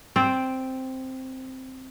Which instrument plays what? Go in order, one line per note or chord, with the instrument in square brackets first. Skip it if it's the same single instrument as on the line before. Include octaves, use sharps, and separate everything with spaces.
[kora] C4 C5 D5